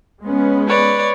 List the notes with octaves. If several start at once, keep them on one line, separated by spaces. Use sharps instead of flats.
G#3 B3 C#4
B4 C#5 D5